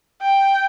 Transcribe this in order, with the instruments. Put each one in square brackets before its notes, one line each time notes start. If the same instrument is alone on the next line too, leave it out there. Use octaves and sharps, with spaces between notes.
[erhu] G5